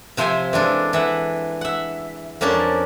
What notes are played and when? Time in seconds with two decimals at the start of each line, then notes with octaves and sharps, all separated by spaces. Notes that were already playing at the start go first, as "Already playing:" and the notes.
0.17 C3 F3 C5 E5 G#5
0.53 E3 G#3 D4 F4 A4
0.93 E3 E5 F#5
1.61 E5 F#5
2.41 F2 A#3 C#4 D4 A5